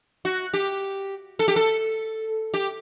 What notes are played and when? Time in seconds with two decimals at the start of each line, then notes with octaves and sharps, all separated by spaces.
0.25 F#4
0.54 G4
1.39 A4
1.48 G4
1.56 A4
2.54 G4